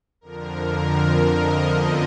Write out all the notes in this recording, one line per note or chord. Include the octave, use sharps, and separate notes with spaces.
F2 D3 F3 A#4
D#5
F#2 D3 F3 B3 D#5